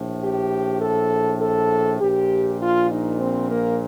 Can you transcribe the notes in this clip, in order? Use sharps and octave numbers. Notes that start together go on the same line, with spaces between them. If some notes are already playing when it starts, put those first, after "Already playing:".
Already playing: A#1 A2
G4
A4
A4
A#1 A#2 G4
F4
D#4
C4
A#3